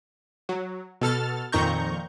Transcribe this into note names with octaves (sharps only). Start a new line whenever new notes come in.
F#3
B2 A4 F6 A6
F2 A#2 D#3 A#5 C#6 G6